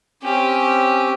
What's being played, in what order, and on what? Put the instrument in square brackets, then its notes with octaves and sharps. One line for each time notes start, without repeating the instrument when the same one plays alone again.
[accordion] C4 C#4 [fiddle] G4